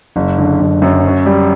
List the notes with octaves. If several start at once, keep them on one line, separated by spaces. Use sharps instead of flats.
F#1
D3
F#1
F#2
C#4
G3